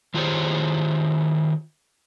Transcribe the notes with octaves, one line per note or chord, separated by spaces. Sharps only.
D#3 F4 G4 G#4 C5 C#5